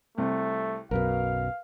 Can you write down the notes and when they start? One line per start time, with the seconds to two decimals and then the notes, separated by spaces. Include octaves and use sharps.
0.18 C2 A3
0.91 B1 F#2 B2 A#4 B4 F5